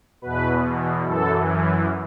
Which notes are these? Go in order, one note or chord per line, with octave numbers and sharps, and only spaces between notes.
E2 B2 B4
F#2 E3 A4